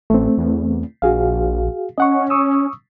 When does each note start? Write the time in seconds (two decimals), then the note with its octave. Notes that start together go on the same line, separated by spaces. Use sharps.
0.10 A1 A3 C4
0.38 E2
1.02 A#1 F#4 G#4 F5
1.98 C#4 D#5 F#5 C#6
2.30 C#6 D#6 E6